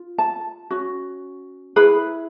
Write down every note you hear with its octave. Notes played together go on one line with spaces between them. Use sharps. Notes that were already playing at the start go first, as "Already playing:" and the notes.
Already playing: F4
A5
C#4 F#4
E4 G#4 B4 B5